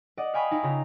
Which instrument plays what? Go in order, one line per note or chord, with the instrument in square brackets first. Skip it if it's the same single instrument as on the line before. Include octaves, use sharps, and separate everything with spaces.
[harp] D5 D#5 F#5
F5 G5 G#5 B5 C#6 D#6
D#4 E4
C#3 F4 A#5